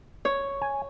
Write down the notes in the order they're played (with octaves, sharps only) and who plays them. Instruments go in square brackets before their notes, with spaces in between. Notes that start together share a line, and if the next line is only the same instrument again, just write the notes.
[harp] C#5
[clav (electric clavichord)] G#5